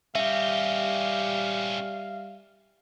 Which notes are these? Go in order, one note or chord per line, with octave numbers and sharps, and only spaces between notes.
G3 C#4 G4 E5 F5